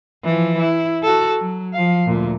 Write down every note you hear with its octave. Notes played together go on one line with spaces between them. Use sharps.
E3 F3
E4
F#4 A4
F#3
F3 F5
D2 A#2